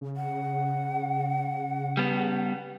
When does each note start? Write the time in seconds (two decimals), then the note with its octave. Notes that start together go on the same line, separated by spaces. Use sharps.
0.01 C#3
0.17 F#5
1.97 G3 B3